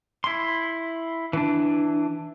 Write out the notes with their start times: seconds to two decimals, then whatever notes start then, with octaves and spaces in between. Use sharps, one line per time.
0.24 E4 C6
1.33 E3 D4